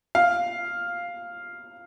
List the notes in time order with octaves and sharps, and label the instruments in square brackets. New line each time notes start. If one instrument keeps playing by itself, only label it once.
[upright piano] F5